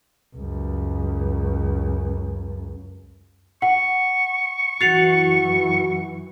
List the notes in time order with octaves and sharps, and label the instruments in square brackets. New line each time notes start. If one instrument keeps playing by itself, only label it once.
[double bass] C#2 F#2
[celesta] F#5 [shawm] C#6
[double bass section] F#2 E3 [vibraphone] F#4 F#5 [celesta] A6 C7 F7